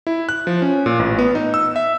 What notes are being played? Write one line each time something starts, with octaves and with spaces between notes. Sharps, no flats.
E4
F#6
F3
C#4
A#2
A1
B3
D#4
E6
E5